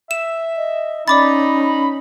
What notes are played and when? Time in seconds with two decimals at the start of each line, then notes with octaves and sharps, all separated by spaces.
0.11 E5 E7
0.57 D#5
1.08 C#4 D#4 D5 B5 D6 A6